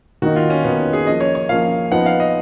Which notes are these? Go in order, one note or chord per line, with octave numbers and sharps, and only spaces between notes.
D#3 A#3 D#4 F#4
F4
C#4
D#3 A#3 B3 D#4
C#4
G#4
F3 A#3 C#4 D#5
C#5
C#5
F3 A#3 C#4 F5
F3 B3 D#4 F#5
F5
D#5